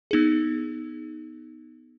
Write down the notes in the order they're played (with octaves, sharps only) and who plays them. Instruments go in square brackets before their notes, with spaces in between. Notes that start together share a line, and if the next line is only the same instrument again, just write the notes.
[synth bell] B3 D#4 G#4